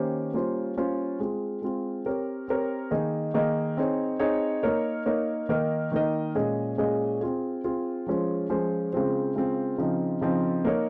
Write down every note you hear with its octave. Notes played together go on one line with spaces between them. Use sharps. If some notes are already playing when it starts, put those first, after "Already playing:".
Already playing: D#3 A#3 C#4 G4 C5
G3 A#3 C#4 F4 C5
G3 A#3 C#4 F4 C5
G#3 C4 F4
G#3 C4 F4
C4 G4 A#4 C#5
C4 G4 A#4 C#5
D#3 A#3 D#4 G#4 D#5
D#3 A#3 D#4 G#4 D#5
C4 D#4 G#4 C#5
C4 D#4 G#4 C#5
A#3 D#4 A#4 C#5
A#3 D#4 A#4 C#5
D#3 A#3 D#4 A#4 D#5
D#3 A#3 D#4 A#4 D#5
A#2 G#3 C#4 G#4 D#5
A#2 G#3 C#4 G#4 D#5
C4 F4 G#4
C4 F4 G#4
F3 G#3 C#4 F4 C5
F3 G#3 C#4 F4 C5
C#3 G#3 C4 F4 C5
C#3 G#3 C4 F4 C5
C#3 F3 C4 D#4
C#3 F3 C4 D#4
A#3 D#4 A#4 C#5